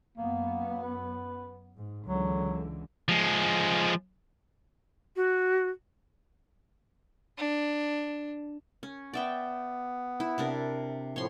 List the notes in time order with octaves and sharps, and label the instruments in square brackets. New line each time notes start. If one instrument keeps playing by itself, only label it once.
[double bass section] F#2 B3 [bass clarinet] A#3
[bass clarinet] B4
[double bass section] G#2
[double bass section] C#2 D3 E3 [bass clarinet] F#3
[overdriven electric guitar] F3 G#3
[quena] F#4
[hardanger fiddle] D4
[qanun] C#4
[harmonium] B3 [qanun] D5 E5 G5
[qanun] E4
C3 D4 A#4
[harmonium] A2 F3 [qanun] C#5 C6